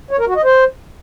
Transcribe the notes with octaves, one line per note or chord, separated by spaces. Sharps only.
C#5
A#4
F#4
D#5
C5